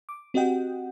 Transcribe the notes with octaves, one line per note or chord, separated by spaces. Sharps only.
D6
C4 F#4 G4 D#5 F#5 G5